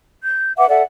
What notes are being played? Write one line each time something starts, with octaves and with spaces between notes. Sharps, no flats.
G6
B4 E5 F#5 D6
A4 D5 E5 F#5